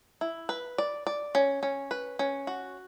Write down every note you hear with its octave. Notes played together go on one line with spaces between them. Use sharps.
E4
B4
D5
D5
C#4
C#4
B4
C#4
F#4